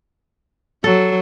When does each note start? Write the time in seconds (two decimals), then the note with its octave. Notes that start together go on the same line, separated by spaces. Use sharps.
0.84 F#3 A4